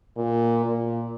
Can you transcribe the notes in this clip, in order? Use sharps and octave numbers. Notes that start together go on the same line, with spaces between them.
A#2
A#2